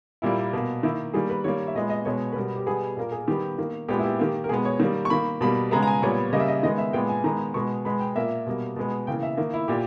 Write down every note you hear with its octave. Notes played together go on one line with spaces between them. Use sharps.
A#2 G3 A#3 E4
B2 A#3
D#3 A#3 E4
D#3 G3 A#3 G#4
B4
D#3 G3 A#3 C#5
E5
A#2 G#3 B3 D#5
D#5
B2 G#3 B3 C#5
B4
B2 G3 B3 A#4
G4
B2 G3 B3 G#4
A#2 A#3 A#4
G#4
D#3 G3 B3 G4
D#3 A#3
A#2 G#3 B3 G4
E4
G4
D#3 A#3 G4
A#4
B2 G#3 B3 G#4
C#5
D#3 G3 A#3
C#6
D#3 A#3 B5
B2 G3 A#3 B5
C#3 G#3 B3 A#5
A#5
G#5
A#2 G3 B3 C#5
C#3 G3 A#3 D#5
E5
D#5
D#3 G#3 B3 D#5
E5
A#2 G#3 B3 G5
G#5
D#3 G#3 B3 A#5
B2 G#3 B3 C#6
B2 G#3 B3 B5
G5
A#2 A#3 E5
B2 G3 A#3
B2 G#3 B3
C#3 E3 A#3 G5
E5
D#3 A#3
E4
A#2 G4